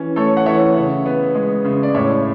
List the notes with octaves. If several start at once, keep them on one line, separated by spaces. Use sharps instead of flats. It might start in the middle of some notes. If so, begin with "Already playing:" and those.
Already playing: E3 C#4
A3 A4 C#5
F#5
E3 C#5 E5
C#3
B3
G#3
C#3
D5
A2 C#5 E5